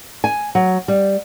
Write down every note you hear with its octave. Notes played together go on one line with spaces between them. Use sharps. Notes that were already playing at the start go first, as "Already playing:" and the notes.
G#5
F#3
G3